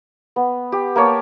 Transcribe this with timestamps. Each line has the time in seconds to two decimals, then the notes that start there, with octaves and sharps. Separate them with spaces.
0.36 B3
0.72 G4
0.96 A#3 A#4 C#5 A5